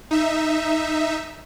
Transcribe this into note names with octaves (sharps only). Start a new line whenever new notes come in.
D#4 E5